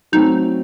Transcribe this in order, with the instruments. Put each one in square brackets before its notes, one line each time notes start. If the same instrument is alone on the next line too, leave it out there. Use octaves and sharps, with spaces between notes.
[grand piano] F#3 A3 C4 [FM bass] D#4